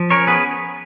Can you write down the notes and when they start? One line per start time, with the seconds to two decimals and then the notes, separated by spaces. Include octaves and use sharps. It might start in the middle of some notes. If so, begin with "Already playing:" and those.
Already playing: F3
0.10 C#4 A#4 C#5
0.27 B3 G#4 B4